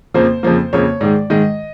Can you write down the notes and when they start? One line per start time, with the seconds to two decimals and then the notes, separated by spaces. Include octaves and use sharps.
0.14 F2 C#3 F3 A#3 C5
0.43 F2 C#3 F3 A#3
0.73 F2 C#3 F3 A#3 C#5
1.01 G#2 D#3 G#3 D5
1.30 G#2 D#3 G#3 D#5